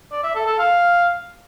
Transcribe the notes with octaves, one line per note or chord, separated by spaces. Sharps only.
D5
E5
A4
A4
F5